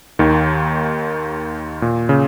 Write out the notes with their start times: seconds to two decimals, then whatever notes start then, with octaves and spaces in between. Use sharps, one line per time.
0.19 D#2 D#3
1.82 A#2
2.09 C#3